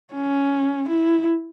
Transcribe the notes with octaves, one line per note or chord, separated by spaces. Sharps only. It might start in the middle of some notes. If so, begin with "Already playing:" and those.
C#4
E4